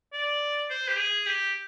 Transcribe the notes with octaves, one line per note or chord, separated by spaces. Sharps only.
D5
C5
G4
G#4
G4